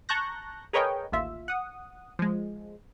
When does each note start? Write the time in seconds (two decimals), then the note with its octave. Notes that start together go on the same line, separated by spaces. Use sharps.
0.09 A5 A#5 C#6 F#6 G6 A#6
0.73 G#4 A#4 B4 C#5 D#5 G5
1.12 A1 D#2 F4 E5
1.48 F#5 D#6
2.19 F3 G#3